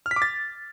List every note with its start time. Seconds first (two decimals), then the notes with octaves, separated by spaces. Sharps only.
0.06 F6
0.11 B6
0.16 D6
0.22 A6